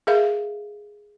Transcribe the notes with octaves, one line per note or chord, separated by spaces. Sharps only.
G#4 A#4 E5 F5